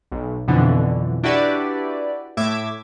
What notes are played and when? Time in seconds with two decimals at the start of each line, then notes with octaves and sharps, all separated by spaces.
0.12 B1
0.48 B1 F2 B2 D3 E3
1.24 D4 E4 F#4 G4 B4 D5
2.37 A2 E5 D6 G#6